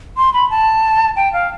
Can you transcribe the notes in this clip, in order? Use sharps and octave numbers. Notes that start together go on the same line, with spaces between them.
C6
B5
A5
G5
F5